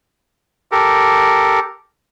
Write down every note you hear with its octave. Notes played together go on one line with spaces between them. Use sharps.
G4 A4 A#4